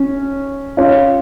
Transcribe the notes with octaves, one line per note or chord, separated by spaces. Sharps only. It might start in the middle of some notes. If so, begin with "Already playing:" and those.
Already playing: C#4
C#4 F4